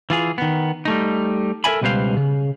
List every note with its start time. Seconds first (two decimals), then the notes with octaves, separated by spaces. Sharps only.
0.10 E3 F4 G#4
0.38 D#3 B3
0.85 G3 A3 D#4
1.64 A4 A#4 D5 E5 G#5 B5
1.82 C#2 B2 G3 B4 C5 F5
2.17 C#3